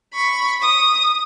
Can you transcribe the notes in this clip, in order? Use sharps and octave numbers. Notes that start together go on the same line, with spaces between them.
B5 C#6
D#6